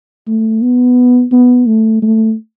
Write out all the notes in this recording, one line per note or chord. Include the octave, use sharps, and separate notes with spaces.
A3
B3
B3
A3
A3